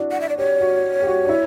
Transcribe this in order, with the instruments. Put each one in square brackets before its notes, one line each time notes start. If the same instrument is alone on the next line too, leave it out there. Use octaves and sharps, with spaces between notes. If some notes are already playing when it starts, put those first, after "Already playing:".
Already playing: [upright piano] D4 E4 F#4
[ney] F#5
E5
D5
[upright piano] G4 [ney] C#5
[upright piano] F#4
G4
F#4
D4
E4